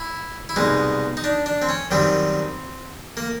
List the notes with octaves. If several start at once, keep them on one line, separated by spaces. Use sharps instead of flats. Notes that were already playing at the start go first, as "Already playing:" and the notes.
Already playing: E4
E4
C2 B2 G#3 D#4
D#4
D4
D4
C4
C#4
F#2 D#3 G3 C4
A#3